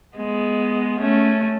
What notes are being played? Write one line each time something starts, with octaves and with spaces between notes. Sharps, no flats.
G#3 B3
A3 C#4